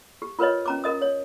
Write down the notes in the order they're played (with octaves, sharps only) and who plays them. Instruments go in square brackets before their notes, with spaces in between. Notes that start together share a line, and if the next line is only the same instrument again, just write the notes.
[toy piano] G4
F4 A#4 B4 C#5 D#5
C#4 A#5 D6
A#4 D#5 D#6
C#5